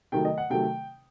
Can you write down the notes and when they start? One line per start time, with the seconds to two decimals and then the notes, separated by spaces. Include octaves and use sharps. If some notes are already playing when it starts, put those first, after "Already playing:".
0.12 C3 D#3 F#3 A3 G5
0.25 D#5
0.38 F#5
0.50 C3 D#3 F#3 A3 G5